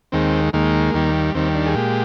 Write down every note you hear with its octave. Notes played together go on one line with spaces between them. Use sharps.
D#2 D#3 G#3 C4
D#2 D#3 G#3 A#3
D#2 D#3 G3
D#2 D#3 G3 C4
D4
G#4
A#2 G#3 G4